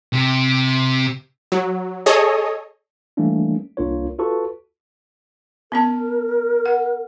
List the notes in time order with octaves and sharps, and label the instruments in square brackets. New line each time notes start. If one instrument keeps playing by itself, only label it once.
[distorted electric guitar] C3
[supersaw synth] F#3
G#4 A4 C#5 D#5
[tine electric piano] E3 G3 A3 A#3 C#4 D4
C2 A#3 D4 F4 A#4 C#5
F4 F#4 A4 B4 A5 C#6
[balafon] B3 C#4 A5 [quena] A#4
[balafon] F#5